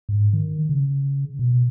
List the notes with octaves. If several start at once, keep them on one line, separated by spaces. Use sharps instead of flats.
G#2
D#3
C#3
B2